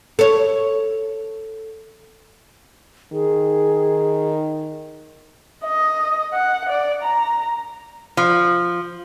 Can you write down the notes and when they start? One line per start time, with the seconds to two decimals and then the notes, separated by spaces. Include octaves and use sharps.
0.19 A4 C#5
3.13 D#3 G#4
5.64 D#5
6.33 F#5
6.69 D5
7.03 A#5
8.17 F3